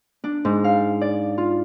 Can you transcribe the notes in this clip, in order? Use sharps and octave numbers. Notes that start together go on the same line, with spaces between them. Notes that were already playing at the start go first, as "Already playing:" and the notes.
D4
G#2
F5
D5
F4